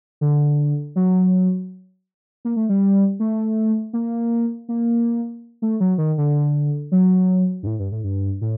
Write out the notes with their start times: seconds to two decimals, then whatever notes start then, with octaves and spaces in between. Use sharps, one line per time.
0.21 D3
0.96 F#3
2.45 A#3
2.56 A3
2.69 G3
3.20 A3
3.93 A#3
4.69 A#3
5.62 A3
5.80 F#3
5.98 D#3
6.18 D3
6.92 F#3
7.63 G2
7.67 A2
7.79 G2
7.92 A2
8.04 G2
8.41 A2